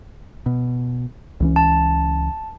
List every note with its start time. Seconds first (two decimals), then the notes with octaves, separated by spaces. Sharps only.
0.46 B2
1.40 C#2 E3 C#4
1.56 A5